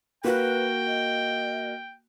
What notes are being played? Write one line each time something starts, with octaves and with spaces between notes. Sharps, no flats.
A#3 F#4 B4 G5
D#5